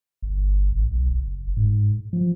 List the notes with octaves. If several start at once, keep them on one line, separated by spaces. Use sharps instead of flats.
G1
A1
B1
F#1
G#2
F3